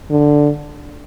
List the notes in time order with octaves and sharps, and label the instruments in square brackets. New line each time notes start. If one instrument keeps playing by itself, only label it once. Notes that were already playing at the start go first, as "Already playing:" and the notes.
[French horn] D3